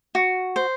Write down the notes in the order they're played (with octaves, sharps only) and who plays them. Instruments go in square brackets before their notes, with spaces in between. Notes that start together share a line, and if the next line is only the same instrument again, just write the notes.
[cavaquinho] F#4
C5